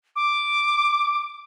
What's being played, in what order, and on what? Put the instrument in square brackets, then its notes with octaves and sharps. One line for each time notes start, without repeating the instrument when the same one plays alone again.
[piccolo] D6